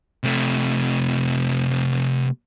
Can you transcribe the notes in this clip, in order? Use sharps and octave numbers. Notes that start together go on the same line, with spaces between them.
C3 A3